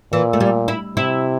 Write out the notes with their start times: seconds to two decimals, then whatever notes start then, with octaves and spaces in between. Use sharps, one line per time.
0.12 A#2 E3
0.33 A3
0.40 G3
0.68 E4
0.96 C3 E4